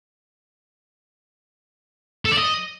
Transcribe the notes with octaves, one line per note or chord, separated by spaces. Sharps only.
A4
D5
D#5